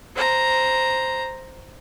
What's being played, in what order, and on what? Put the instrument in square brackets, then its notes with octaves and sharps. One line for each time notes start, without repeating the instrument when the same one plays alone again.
[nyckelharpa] C5 A#5